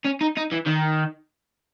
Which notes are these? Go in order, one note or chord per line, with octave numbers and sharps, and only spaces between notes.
C#4
D#4
D#4
E3
D#3